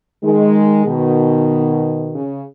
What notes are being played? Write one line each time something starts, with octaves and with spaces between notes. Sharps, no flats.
D#3 G#3
B2 D#3
C#3